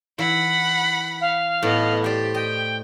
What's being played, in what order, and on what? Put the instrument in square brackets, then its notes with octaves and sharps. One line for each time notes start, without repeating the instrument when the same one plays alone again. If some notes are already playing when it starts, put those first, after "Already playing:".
[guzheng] E3 [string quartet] F#5 B5
[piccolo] F5
[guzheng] A2 [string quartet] B3 D#5
[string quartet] G4 [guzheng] C5 D5
[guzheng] D#5 [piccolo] G5